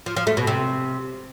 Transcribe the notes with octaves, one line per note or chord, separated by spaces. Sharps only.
F3
F3
A3
B2
C3